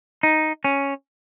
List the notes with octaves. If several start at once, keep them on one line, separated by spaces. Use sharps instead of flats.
D#4
C#4